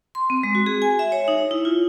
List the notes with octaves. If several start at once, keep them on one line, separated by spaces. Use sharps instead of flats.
C6
C4
G#3
F#4
G#4
G#5
E5
C#5
D#4
E4
F4